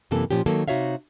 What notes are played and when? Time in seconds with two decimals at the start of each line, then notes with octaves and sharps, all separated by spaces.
0.11 F#2 C3 E3 A#3 A4
0.31 A#2 F3 C#4 G4
0.46 D#3 F#3 A#3 A4
0.68 C3 D#4 F#4 C#5 E5 F5